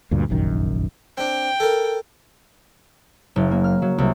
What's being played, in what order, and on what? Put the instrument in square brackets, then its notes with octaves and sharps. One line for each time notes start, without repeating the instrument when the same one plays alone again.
[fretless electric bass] D2 G2 A#2
F1 A#1 F#2 D#3
[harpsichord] C4 D4 [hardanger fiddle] G5
[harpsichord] A4 A#4
[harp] F#1
A#3
F6
F#3
C2